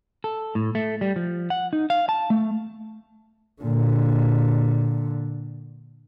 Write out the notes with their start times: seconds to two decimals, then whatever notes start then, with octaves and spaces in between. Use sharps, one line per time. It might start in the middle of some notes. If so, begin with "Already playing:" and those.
0.24 A4
0.55 A2
0.75 A3
1.01 G3
1.16 F3
1.50 F#5
1.73 D#4
1.90 F5
2.09 A5
2.30 A3
3.62 A#2 D3